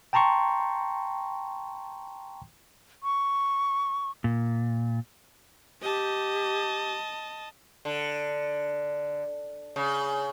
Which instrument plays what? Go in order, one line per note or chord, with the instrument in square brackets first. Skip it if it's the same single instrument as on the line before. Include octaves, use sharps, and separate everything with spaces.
[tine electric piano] G5 A5 A#5 C6 C#6
[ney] C#6
[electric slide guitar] A#2
[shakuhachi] G4 [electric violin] D#5 A5
[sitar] D3
C#3